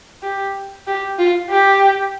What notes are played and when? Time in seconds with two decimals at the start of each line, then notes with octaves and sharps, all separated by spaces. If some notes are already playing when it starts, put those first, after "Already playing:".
0.22 G4
0.87 G4
1.19 F4
1.50 G4